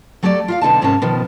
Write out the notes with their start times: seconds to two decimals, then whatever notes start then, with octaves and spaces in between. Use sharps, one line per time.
0.23 F#3 A3 G4 A4 D5
0.48 F4 E5 F5
0.61 B2 D3 D#4 A5
0.81 G#2 C3 C#4 A#4 C#5 A5
1.02 B2 D#3 F3